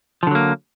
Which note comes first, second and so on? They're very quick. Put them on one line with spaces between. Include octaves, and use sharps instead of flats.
F3 D3 F#3 A#3